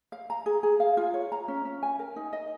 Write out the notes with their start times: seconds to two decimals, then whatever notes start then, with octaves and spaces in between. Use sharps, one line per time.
0.12 F5
0.30 A#5
0.46 G#4
0.63 G#4
0.80 F5
0.97 F4
1.14 C#5
1.32 A#5
1.48 C#4
1.65 C#4
1.83 G#5
1.99 A#4
2.16 D#4
2.33 D#5